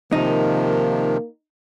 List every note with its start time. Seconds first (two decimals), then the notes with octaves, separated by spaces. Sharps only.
0.13 C3 D#3 F3 A#3 D#4